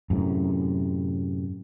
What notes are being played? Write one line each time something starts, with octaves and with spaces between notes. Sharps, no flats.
F#2 A2 C3